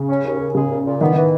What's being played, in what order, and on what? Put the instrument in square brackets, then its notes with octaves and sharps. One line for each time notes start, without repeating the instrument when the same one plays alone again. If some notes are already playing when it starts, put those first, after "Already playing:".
Already playing: [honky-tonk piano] C#3
[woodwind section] C#4
D#2
D#2
[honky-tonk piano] C#3 [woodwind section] G#4
[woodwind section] A#2
A#2
[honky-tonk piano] D#3 [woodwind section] B3
[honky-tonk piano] D#3 [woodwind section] E3